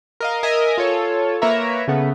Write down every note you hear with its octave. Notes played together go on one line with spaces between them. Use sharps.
A#4 D#5 F5
A#4 D#5 E5 G#5 D#6
F4 A4 C#5
A#3 A#4 B4 C#5 E5 A#5
C#3 A3 B3